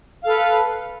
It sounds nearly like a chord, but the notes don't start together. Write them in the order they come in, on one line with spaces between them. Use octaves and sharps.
F5 A4 B4